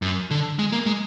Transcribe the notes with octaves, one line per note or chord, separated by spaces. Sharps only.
F#2
D3
G#3
A#3
G#3